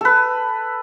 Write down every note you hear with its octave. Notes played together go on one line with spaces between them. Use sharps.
A4 B4